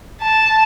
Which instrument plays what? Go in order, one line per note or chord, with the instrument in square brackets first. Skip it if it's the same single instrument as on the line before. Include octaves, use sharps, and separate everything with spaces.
[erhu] A5